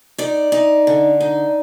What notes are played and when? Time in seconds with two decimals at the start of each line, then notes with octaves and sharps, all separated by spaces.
0.18 D#4 D5
0.52 D#4
0.87 D3
1.21 D#4